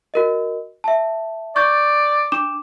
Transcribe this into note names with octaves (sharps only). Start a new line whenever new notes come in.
F#4 A#4 D#5
E5 A5
D5 C#6 G6 A6
D4 D6 E7